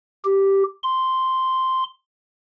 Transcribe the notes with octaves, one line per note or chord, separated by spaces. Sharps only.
G4
C6